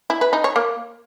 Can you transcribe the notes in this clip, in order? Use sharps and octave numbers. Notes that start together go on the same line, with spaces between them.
E4
B4
D#4
C#5
A#3